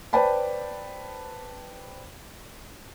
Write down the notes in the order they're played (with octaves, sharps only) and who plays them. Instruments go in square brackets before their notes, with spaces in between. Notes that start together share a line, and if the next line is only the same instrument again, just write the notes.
[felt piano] B4 C5 D5 G5 A5 B5